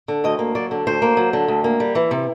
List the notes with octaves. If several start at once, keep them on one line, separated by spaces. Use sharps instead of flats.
D3
D2 D#5
A#3
F#3 D5
D3
D2 C5
A#3
F#3
D3
D2
A#3
G3
E3
C3